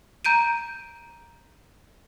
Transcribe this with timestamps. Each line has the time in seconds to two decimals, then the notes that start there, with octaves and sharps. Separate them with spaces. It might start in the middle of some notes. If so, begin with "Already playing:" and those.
0.25 A#5 G6 D7 D#7